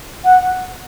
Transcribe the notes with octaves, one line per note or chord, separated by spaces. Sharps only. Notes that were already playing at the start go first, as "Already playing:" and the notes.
F#5